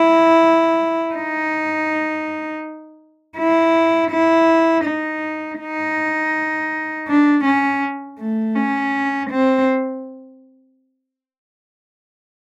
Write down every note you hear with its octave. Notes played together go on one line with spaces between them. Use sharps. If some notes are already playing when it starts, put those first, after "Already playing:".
Already playing: E4
D#4
E4
E4
D#4
D#4
D4
C#4
A3
C#4
C4